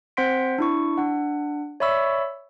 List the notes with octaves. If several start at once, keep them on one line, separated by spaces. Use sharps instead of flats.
C4 C5 F#5 C6 B6 D7
D4 E4 C#6
D4 F#5
C#5 D5 E5 B5 C#6 E6